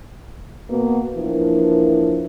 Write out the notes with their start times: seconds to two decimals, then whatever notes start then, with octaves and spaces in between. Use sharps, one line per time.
0.70 B2 A#3 B3
1.15 E3 F3 A#3 D4